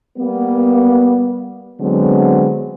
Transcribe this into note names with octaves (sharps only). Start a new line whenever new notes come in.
G3 A#3 B3
D3 F#3 G#3 B3 C4